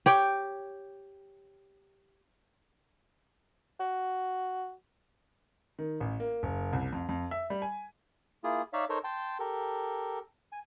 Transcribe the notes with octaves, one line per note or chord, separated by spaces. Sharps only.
G4 C#5 G5
F#4
D#3
A1
A#3
F#1
C2
F2
F2
E5
G3
G#5
A#3 E4 F4 G#4
D#4 C#5 D5 E5 F5
D#4 A4 A#4 C5 C#5
G5 A5 C6
G4 A4 A#4
G#5